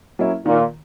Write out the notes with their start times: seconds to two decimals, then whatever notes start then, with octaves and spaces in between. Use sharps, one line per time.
0.19 F#3 A#3 C#4 E4
0.45 A#2 D#3